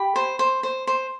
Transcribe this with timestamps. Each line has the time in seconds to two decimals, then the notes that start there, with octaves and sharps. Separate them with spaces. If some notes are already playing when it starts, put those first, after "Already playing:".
Already playing: G4 B5
0.16 C5
0.39 C5
0.63 C5
0.87 C5